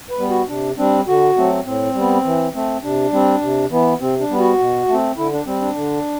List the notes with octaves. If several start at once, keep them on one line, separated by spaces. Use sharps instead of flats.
B4
G3 B3
F#4
C3 D4
G3 C4 D4
D3 F#4
F#3 A3 C4
A2 C4
G3 B3
E3
A3 C4
C3 D4
G3 C4
C3
E3 B3
C3 C4
D4
G3 B3
F#4
B2
A3
C4
D3 E4
D4
G3 C4
D4
D3